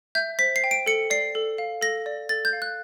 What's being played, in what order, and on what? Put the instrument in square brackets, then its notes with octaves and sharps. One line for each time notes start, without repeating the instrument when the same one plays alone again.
[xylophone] E5 G6
C5 B6
C7
G5
D7
A4 C#7
D5 C7
A4
F5
A4 A#6
D5
A4 A6
G6
F5
F#6